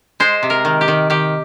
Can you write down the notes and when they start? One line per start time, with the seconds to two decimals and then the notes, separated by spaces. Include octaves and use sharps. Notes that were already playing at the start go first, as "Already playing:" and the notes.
0.20 G#3 C5
0.43 C3
0.50 A#4
0.65 D#3
0.81 G4
0.88 D#3
1.10 D#3 G4